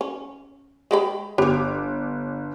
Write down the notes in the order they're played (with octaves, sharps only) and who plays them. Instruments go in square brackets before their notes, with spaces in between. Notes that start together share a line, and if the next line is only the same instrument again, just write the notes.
[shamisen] C#4
G#3 G4 B5
[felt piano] G1 D6 [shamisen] G4 C#5